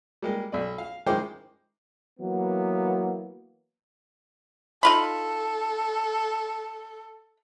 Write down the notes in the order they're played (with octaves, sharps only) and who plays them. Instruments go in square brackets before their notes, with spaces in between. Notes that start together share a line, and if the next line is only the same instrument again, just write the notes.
[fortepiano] G3 G#3 A#3
B1 D5
F5
D#3 G#3 E4 C5 G5 D6
[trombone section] E3 F#3 A#3 B3
[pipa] D#4 F4 B5 [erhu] A4